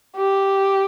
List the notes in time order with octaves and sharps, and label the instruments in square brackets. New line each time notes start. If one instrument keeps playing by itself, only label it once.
[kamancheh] G4